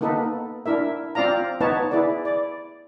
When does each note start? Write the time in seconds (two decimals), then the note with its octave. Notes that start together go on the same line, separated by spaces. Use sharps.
0.01 A#3 B3 D#4 A4 B4
0.66 D4 E4 A#4 E5
1.15 C4 F4 D5 F5 A#5
1.61 B3 D#4 B4 C#5 A5
1.91 E4 G#4 B4 D5
2.25 D5